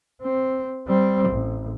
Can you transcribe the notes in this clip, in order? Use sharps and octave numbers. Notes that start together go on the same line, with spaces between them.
C4
G3 C4
A1